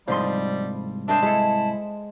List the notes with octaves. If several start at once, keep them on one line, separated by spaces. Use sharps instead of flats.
C2 G#2 F3 G3 D#5 C6
D4 C5 D#5 E5 A5
G#3 E4 A4